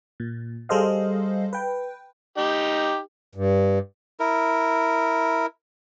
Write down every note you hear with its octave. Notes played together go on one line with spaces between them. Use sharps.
A#2
G3 G#4 A4 C5 D#5 F5
B4 G5
D#4 G4
G2
E4 A#4